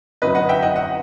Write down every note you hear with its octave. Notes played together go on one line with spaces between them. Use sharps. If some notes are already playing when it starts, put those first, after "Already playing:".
G1 F#2 F#3 C4 B4 D#5
D#5 F#5
E5 G5
D#5 F#5
D#5 F#5